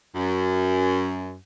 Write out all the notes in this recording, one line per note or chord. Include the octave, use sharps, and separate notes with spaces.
F#2